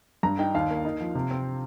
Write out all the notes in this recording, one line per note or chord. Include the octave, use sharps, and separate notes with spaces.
G2 A#5
D#4 G5
D#2 F5
A#3
D#4
F3
C3
C4